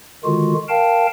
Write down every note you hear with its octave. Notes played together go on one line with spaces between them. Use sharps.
D3 D#3 G#3 F4 F#4
A#4 F5 G5 A5